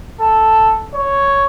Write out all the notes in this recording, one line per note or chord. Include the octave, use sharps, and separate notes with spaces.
A4
C#5